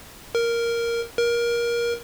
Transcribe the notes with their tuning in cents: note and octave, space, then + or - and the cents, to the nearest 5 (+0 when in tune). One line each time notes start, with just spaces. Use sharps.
A#4 +0
A#4 +20